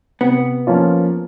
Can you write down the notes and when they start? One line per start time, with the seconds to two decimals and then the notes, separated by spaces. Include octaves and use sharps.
0.21 C3 B3
0.67 F3 A#3 C#4 F4